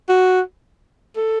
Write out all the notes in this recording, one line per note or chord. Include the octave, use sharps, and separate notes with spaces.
F#4
A4